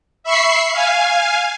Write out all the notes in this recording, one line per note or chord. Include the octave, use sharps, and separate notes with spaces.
E5 B5 C#6 C7
F5 G#5